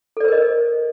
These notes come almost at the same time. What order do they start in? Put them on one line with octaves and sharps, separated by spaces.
A4 D5 C5 A#4 D#5